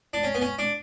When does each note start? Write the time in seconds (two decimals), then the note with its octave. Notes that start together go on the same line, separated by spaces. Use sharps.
0.13 D4
0.23 C#4
0.34 B3
0.41 C#4
0.59 D4